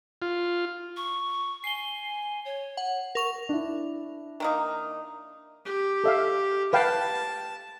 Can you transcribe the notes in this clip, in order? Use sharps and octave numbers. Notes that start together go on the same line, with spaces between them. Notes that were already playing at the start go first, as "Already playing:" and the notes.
F4
C#6
G#5 C7 G7
C#5
F#5
A#4 C#6 F7
D4 E4
D#3 A#3 D#4
G4
A4 E5 F5
B4 F5 G5 A5